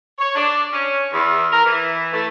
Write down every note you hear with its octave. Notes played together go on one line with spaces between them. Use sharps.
C#5
D4
C#4
E2
A#4
E3
A3